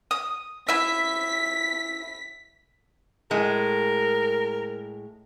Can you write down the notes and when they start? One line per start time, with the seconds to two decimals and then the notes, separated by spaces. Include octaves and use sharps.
0.11 D#6
0.68 E4 E5 B6
3.31 A2 G#3 A#4